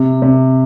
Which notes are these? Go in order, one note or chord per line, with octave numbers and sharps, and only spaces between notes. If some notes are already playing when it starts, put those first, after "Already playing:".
Already playing: C3
C3